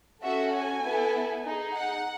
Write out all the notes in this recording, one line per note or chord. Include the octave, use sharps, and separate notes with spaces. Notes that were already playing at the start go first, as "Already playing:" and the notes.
C#4 F#4 A4 E5
G#5
B3 E4 A4
D#4 G#4
F#5